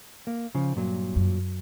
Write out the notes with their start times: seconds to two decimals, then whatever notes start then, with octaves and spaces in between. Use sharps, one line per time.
0.27 A#3
0.55 C#3 F3
0.76 G2 A#2 F#3
1.16 F#2